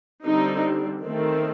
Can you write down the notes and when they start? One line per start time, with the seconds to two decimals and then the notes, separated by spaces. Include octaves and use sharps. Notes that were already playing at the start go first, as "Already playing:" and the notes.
0.25 D3 G3 C4 D#4
1.04 D#3 A3 C4